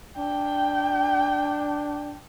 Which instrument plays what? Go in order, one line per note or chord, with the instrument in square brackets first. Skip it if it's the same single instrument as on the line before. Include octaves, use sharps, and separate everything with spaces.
[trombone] D4 [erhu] G5